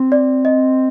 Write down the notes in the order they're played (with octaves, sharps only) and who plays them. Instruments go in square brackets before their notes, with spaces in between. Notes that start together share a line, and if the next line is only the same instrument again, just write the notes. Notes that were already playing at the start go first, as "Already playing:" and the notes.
Already playing: [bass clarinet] C4
[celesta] D5
D#5